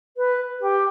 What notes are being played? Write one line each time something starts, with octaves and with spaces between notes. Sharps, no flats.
B4
G4